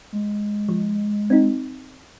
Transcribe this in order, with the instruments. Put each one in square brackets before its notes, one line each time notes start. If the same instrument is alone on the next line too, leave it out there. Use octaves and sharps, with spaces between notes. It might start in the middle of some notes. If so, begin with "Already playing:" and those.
[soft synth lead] G#3
[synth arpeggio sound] F3
C4 D#4